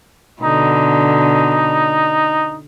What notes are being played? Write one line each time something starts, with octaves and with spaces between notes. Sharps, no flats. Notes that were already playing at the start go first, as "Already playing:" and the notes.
B2 D3 D#4